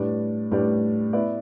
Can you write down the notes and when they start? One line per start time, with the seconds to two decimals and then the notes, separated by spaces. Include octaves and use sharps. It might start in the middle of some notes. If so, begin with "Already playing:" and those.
Already playing: A2 G3 D4 B4 D5
0.51 A2 G3 D4 B4 D5
1.13 B3 E4 B4 D5